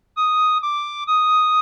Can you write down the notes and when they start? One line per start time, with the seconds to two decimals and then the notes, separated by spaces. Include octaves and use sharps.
0.17 D#6
0.62 D6
1.07 D#6